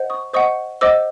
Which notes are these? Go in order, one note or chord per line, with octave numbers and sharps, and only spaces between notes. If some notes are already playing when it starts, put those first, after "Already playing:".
Already playing: C5 D#5 F#5
C#6 D#6
C5 D#5 F#5 C#6 D#6
C5 D#5 F#5 D6 E6